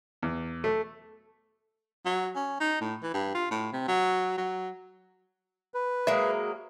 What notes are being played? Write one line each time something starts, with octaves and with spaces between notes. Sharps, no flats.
E2
A3
F#3
C#4
D#4
A2
E3
G2
F4
A2
C3
F#3
F#3
B4
F#3 G#3 A#3 E5